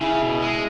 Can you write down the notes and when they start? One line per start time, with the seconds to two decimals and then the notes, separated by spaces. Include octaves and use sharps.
0.01 C#3 E4 G#4
0.22 B2
0.42 G#3